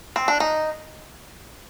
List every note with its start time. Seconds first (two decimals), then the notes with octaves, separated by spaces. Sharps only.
0.16 C4
0.28 D4
0.40 D#4